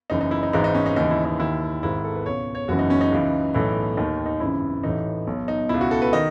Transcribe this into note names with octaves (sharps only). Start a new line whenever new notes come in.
F#1 F#2 C#3 E3 D#4
D#4
E4
D#4
G#1 G#2 E3 D#4
D#4
C#4
D#4
D#2 C#3 E3 D#4
E4
D#4
D#2 D#3 E4
G#1 G#2 D#3 E4
A4
B4
C#2 B2 C#5
C#5
F#1 F#2 C#3 E3 F#4
D#4
C#4
D#4
C#2 C#3 E3
B1 A2 E3
D#2 D#3 D#4
D#4
G#1 F#2 C#3 E3 E4
A1 A2 E3 D#4
B1 B2
D#4
C#2 B2 E4
F#4
A4
B4
D#3 D#5